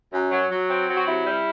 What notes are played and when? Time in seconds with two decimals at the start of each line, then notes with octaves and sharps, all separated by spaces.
0.12 F#2
0.31 F#3
0.50 F#3
0.69 C4
0.88 F#3
0.97 F#4
1.06 C3 E4
1.25 G3